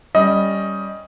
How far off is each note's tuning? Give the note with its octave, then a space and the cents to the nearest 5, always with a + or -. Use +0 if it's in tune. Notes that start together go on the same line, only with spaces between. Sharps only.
G3 +0 C#4 +0 D#5 +10